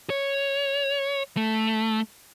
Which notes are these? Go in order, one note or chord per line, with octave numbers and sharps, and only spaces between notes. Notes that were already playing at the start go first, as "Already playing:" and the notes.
C#5
A3